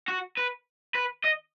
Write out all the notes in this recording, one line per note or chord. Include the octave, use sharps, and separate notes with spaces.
F#4
B4
B4
D#5